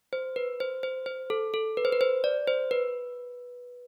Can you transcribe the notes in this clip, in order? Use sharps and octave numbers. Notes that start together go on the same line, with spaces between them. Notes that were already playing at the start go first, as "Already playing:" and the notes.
C5
B4
C5
C5
C5
A4
A4
B4
C5
B4
C5
D5
C5
B4